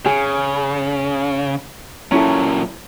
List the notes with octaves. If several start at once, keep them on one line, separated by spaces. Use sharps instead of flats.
C#3 G#4
A#2 F#3 C#4 E4 A4